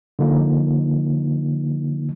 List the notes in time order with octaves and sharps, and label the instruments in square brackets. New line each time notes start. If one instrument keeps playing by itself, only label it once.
[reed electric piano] D3 F3 A#3 D#4